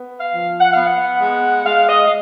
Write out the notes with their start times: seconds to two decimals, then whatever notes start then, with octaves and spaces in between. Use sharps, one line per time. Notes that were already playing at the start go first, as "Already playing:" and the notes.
Already playing: B3
0.19 F5
0.33 F3
0.60 F#5
0.73 B3 F5
0.86 F#5
1.21 G#3
1.65 G#3 F5
1.87 D#5
2.05 F5